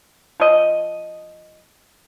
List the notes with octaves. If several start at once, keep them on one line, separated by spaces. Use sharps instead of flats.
F3 D#5